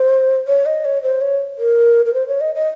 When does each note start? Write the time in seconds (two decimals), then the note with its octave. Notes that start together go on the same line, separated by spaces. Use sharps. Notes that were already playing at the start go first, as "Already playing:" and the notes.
Already playing: C5
0.48 C#5
0.66 D#5
0.85 C#5
1.03 C5
1.21 C#5
1.58 A#4
2.06 A#4
2.14 C5
2.28 C#5
2.41 D#5
2.55 D#5